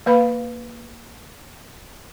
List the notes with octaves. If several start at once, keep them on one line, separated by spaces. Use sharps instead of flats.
A#3 B4 F5 B5